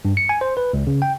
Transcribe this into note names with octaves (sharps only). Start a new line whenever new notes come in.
G2
C#7
G#5
C5
B4
C#2
C#3
G5